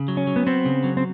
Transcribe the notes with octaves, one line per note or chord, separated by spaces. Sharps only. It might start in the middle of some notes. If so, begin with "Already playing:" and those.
Already playing: C#3
F#3
C#4
F#3
B3
B3 C4
C#3
F#3
C4